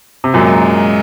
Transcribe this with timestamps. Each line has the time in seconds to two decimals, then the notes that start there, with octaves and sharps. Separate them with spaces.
0.24 C3
0.34 F#2 A#2 G#3